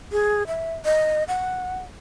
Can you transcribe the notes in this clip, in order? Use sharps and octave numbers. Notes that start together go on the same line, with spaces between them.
G#4
E5
D#5
F#5